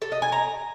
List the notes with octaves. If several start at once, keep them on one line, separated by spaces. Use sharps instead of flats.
A4
D#5
G#5
A#5